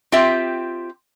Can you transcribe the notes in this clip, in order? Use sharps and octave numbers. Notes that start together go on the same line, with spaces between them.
C4 F4 G4 E5